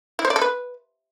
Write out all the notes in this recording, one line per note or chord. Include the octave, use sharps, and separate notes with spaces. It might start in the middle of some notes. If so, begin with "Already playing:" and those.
E4
C5
D5
A4
B4